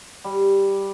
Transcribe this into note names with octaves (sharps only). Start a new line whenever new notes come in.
G3